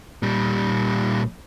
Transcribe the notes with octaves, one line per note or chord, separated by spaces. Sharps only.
A#2 G3